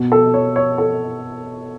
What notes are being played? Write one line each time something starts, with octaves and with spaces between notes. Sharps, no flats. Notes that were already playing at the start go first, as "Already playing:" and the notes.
Already playing: B2
A4
C#5
C#5
A4